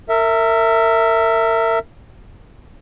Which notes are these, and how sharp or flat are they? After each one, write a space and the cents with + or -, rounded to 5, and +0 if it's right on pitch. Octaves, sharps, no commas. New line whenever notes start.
A#4 -35 E5 +0